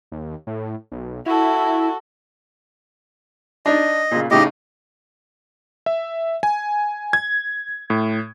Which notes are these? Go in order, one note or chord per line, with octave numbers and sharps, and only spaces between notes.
D#2
A2
B1
E4 F#4 A4
D4 D#4 D#5
A#2 C#3
A2 C#3 D#4 G4 D#5
E5
G#5
G#6
A2